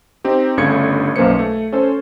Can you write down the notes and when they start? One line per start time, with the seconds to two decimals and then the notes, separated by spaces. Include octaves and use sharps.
0.24 C4 D#4 G4
0.57 G1 G2 C#3 A3 G#6 C#7
1.16 B1 F#2 A#3 B4 C5 C#7
1.39 A3
1.73 C#4 A4 C5